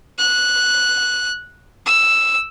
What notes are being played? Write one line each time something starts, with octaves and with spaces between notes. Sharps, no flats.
F#6
E6